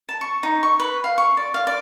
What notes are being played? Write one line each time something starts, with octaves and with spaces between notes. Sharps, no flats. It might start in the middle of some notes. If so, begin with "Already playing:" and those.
A5
C#6
D#4
C#6
B4
F5
C#6
D5
F5
D5